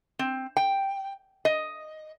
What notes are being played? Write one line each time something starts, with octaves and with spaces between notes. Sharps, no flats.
C4
G5
D#5